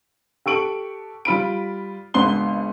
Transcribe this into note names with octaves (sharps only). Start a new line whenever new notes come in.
G4 A4 C#6 D7 F#7
G3 F4 B5 D7
G#1 C#2 B3 D4 C6 G7